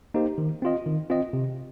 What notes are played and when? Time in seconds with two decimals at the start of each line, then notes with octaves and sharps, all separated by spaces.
0.14 A#3 D#4 G4 C5
0.38 D#3
0.62 C4 F4 D#5
0.86 D#3
1.10 C4 F4 D#5
1.33 C3